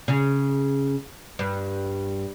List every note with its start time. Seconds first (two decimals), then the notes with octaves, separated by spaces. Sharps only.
0.08 C#3
1.39 G2